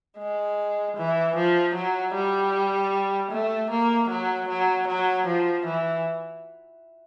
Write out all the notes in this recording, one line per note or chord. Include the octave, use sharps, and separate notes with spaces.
G#3
E3
F3
F#3
G3
A3
A#3
F#3
F#3
F#3
F3
E3